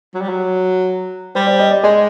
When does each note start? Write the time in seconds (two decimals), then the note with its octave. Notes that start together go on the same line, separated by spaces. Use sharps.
0.14 F#3
0.21 G3
0.29 F#3
1.35 G3 C5
1.47 D5
1.59 D#5
1.71 D5
1.83 G#3 D#5